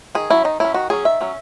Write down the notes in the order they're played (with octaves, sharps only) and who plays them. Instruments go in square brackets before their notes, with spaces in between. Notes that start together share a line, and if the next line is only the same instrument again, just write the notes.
[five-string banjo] D#3 G#4
F#3 C#4 E4
D#3 D#4
F#3 C#4 E4
D#3 F#4
F#3 C#4 G#4
D#3 E5
F#3 C#4